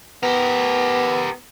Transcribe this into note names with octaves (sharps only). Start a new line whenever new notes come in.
B3 G4 A#4